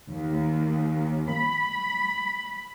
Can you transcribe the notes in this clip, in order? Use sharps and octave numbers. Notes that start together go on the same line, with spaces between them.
D#2
B5